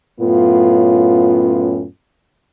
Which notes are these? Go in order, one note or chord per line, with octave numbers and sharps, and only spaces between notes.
F#2 A2 B3 C#4 F4